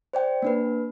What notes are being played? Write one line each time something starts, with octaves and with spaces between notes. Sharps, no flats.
C5 D5 G5
A#3 D4 B4